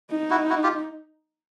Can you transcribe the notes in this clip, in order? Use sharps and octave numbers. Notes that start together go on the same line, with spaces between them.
D#4
E4 F#4
E4 F#4
F4 G4